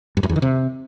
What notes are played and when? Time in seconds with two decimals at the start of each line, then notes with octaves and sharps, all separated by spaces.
0.17 G2
0.23 F#2
0.29 E2
0.36 D#3
0.42 C3